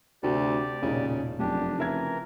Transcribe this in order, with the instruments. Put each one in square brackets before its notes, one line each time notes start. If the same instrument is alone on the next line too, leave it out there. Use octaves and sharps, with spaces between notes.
[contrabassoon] D2 [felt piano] C3 A3 F#4 [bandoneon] G4 D5
[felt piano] E1 A#2 D#4 [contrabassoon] C#3
[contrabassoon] F1 [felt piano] F#2 [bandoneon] D4 G4
[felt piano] C#3 E5 G#6 [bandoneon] E3 A#4